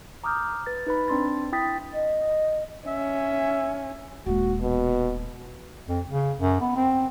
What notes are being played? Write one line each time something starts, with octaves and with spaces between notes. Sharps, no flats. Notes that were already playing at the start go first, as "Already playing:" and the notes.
A#5 D6 D#6 F6 G6
B4 A6
D#4 B4 B5
C4 D4 C6 A6
E4 G5 D#6 A6 B6
D#5
C#4 E5
D#1 G#3 F#4
B2
F2
C#3
F#2
B3
C4